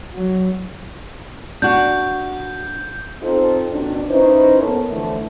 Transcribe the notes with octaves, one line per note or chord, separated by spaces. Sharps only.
F#3
D4 F#4 G6
C4 D#4 F4 A4 C5
B2 D#3 C#4 D4
C#4 D#4 E4 B4 C5
B3 C#4 A4 A#4
D3 E3 F3 A3